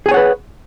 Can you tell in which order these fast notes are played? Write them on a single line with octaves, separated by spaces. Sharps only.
G#4 G#5 C#5 F#5 B4